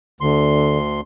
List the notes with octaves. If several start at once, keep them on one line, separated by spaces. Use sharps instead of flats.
D2 D3 C6